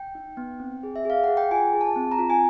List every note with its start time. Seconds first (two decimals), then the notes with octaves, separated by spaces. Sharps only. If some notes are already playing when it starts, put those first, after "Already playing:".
Already playing: G5
0.15 D#4
0.37 B3
0.60 C4
0.83 G#4
0.96 E5
1.05 G#4 F5
1.24 G#4 F#5
1.37 G5
1.51 F4 G#5
1.73 G#4
1.81 A5
1.96 C4
2.12 A#5
2.19 F4
2.30 G#5